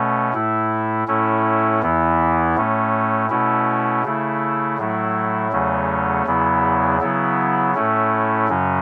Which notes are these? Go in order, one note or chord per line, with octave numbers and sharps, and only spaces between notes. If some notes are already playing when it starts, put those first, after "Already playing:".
Already playing: B2 A3 C#4
A2 A3 E4
A2 A3 C#4 E4
E2 E3 B3 E4
A2 A3 C#4
B2 A3 C#4 E4
C#3 A3 E4
A2 F#3 A3 E4
E2 C#3 F#3 A3 C#4
E2 C#3 F#3 B3 E4
C#3 F#3 B3 E4
A2 A3 C#4 E4
F#2 C#3 F#3 C#4